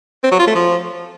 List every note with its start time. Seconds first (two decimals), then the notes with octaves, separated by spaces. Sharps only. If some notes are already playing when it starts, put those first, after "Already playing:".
0.24 C4
0.31 F#3
0.39 F4
0.47 A3
0.55 F3